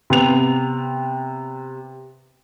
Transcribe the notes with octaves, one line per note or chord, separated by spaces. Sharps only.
C3 B3 F7